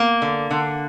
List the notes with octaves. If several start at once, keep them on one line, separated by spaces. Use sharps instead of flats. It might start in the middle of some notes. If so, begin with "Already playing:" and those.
Already playing: A#3
D3
D3